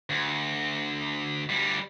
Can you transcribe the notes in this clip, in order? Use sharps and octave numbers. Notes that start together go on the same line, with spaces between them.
D2
D2 G3